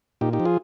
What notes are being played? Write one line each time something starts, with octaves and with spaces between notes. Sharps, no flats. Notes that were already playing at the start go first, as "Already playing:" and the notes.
A#2 D#4 G4
D#4 G4
F3
F4 G#4